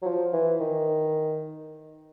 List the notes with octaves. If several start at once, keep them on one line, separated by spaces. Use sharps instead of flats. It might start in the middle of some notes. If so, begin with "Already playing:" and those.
F#3
F3
E3
D#3